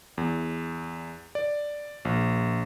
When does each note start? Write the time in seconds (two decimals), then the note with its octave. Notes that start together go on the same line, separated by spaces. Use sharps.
0.18 E2
1.35 D5
2.05 A#1